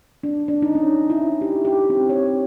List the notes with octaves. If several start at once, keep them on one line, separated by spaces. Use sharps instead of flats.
D4
D4
D#4
C#4
E4
G4
G4
C4
C#5